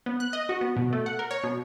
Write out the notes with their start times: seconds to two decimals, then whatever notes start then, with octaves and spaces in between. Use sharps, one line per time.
0.06 B3
0.20 F#6
0.33 D#5
0.49 F#4
0.61 B3
0.76 B2
0.93 A3
1.06 F#5
1.19 A#4
1.31 C#5
1.43 B2